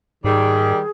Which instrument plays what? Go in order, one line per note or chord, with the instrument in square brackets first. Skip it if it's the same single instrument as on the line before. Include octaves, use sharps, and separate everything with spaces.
[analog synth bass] G#2 [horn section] D#3 G3 [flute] G#4